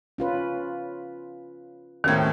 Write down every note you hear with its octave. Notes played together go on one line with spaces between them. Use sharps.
C#4 F4 B4
D#2 A2 D#3 C4 C#4 A#4 G#6